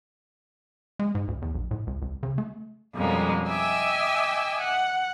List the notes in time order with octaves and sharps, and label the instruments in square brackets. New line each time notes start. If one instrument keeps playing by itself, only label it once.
[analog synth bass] G#3
G#2
D2
E2
B1
A2
C#2
C#2
C#3
A3
[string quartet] F2 B2 G3 G#3 A#3 C#4
D#5 E5 G5 G#5 D6 E6
F#5